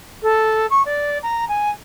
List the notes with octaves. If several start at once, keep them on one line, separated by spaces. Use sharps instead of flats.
A4
C#6
D5
A#5
G#5